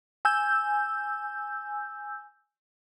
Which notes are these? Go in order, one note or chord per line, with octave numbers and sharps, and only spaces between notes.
G#5 E6 G6